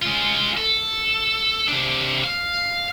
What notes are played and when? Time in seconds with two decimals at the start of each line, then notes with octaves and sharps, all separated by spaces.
0.02 G#3 F4
0.57 A4
1.68 C3 D4
2.24 F5